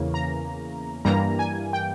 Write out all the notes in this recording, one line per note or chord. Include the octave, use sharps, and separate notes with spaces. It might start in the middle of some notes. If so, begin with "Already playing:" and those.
Already playing: E2 C#3 E3 A#3 C#4
A#5
G2 E3 G3 A#3 A#5
G#5
G5